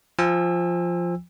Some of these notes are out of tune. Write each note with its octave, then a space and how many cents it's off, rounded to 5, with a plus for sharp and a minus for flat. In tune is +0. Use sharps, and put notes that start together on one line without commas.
F3 +0 G#5 -40 E6 +0